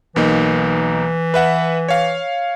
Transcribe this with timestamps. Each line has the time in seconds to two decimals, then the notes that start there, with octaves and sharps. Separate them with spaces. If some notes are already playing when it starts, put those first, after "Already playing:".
0.16 B1 E3 A#3 D#4
1.34 B4 E5 F#5
1.89 C#5 F5